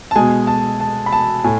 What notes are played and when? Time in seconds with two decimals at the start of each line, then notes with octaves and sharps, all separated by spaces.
0.11 A5
0.16 B2 G#3 G#5
0.47 A5
0.80 A5
1.06 B5
1.13 A5
1.44 A2 G#5